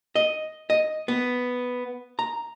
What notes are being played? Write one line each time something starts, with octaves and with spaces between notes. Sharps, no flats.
D#5
D#5
B3
A#5